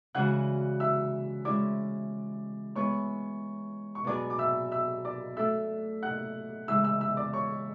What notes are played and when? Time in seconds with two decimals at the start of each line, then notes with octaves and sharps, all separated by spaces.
0.15 C#3 E3 G#3 D4 F#4 F#5 F#6
0.80 E5 E6
1.45 G#3 C#4 E4 D5 D6
2.75 G#3 B3 E4 C#5 C#6
3.95 C#6
4.04 B2 F#3 B3 D4 G#4 D5 D6
4.30 D6
4.39 E5 E6
4.71 E5 E6
5.05 D5 D6
5.37 A3 D4 A4 E5 E6
6.03 F#5 F#6
6.68 C#3 E3 G#3 E5 E6
6.84 E5 E6
7.00 E5 E6
7.17 D5 D6
7.33 C#5 C#6